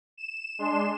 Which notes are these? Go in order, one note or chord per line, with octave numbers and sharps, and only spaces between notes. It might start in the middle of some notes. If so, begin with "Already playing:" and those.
E7
G#3 D4 C6 E7